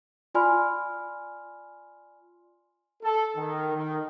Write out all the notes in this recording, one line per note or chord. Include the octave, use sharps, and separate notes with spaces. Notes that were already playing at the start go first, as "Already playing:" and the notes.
F4 D5 G#5 B5 C6 F6
A4
D#3
D#3